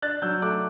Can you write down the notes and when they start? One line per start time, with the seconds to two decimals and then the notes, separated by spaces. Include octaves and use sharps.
0.02 D4 F#6 A6
0.22 F#3 E6 G6
0.42 A3 D6 F#6